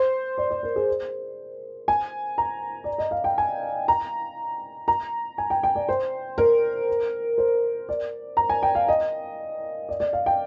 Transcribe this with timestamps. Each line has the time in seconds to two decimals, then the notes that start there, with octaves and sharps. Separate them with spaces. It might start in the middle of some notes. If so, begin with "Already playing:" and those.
Already playing: C5
0.38 D5
0.51 D5
0.63 A#4
0.76 G#4
1.88 G#5
2.38 A#5
2.84 D5
2.98 D#5
3.11 F5
3.24 G5
3.38 G#5
3.88 A#5
4.88 A#5
5.38 G#5
5.50 G5
5.63 G5
5.76 D5
5.89 C5
6.38 A#4
7.38 C5
7.89 D5
8.37 A#5
8.49 G#5
8.63 G5
8.75 F5
8.88 D#5
9.89 D5
10.00 D5
10.13 F5
10.26 G5